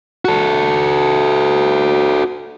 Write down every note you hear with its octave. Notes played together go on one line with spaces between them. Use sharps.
F#4 A4